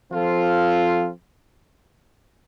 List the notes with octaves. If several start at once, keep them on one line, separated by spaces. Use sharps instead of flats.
F3 C4 F4 A4